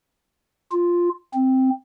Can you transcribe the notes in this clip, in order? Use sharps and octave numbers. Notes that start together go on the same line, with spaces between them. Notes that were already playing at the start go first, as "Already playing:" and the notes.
F4
C4